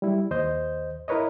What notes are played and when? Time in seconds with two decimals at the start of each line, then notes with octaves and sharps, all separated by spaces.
0.02 G3 E4
0.31 D#2 C5 D#5 G6
1.08 E4 A#4 B4 C#5 D#5